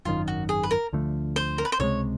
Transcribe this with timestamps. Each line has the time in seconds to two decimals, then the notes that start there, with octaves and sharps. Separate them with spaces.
0.05 G#1 F#2 D#3 F4
0.28 F#4
0.49 G#4
0.63 B4
0.71 A#4
0.93 D2 D3 F3 A3
1.36 C5
1.58 A#4
1.65 B4
1.72 C5
1.79 C#2 C3 E3 G#3 C#5